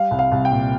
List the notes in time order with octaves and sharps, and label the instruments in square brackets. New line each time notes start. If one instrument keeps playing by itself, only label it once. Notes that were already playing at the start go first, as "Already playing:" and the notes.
Already playing: [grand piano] G3 F5
C2
F5
C2
G5
A#2